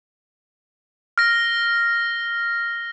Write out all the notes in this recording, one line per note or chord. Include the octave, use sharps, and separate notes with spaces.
F6 A#6